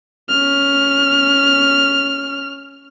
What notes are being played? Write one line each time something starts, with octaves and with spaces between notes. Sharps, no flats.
C#4 F6